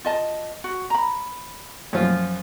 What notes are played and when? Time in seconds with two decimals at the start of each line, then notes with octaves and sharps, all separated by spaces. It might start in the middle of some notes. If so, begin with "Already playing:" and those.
0.05 F4 D#5 A5
0.64 F#4
0.90 A#5 B5
1.93 F#2 F3 F4